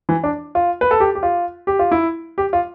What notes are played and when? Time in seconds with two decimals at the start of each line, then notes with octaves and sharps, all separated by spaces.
0.09 E3
0.23 D4
0.55 F4
0.81 B4
0.91 A4
1.00 G4
1.15 G4
1.23 F4
1.67 G4
1.79 F4
1.91 E4
2.38 G4
2.53 F4